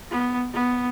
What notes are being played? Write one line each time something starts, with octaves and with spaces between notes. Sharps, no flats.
B3
B3